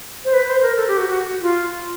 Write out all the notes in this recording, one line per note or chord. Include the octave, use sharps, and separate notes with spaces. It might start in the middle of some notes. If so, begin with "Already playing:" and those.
C5
B4
C5
A#4
A4
G4
F#4
F#4
F4